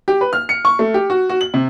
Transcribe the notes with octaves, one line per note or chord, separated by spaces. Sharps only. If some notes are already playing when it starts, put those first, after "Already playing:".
G4
B4
F6
C#7
C#6
A3
G4
F#4
F#4
F#7
C3